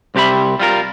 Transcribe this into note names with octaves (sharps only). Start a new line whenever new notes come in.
C2 C4 G4 E5 B5
G3 F4 A#4